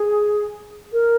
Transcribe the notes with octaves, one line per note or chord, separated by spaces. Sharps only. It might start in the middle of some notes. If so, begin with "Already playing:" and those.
Already playing: G#4
A#4